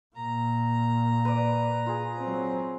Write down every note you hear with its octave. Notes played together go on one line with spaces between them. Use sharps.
A#2 A#5
B4 D5
F4 G#4
F#3 C4